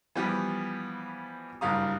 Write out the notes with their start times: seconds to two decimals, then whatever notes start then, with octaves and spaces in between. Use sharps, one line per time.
0.15 E3 F3 G3 B3 G4
1.61 F#1 G2 G4 F5 A#5 D#6